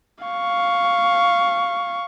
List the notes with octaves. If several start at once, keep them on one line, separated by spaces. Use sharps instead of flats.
F5 C#6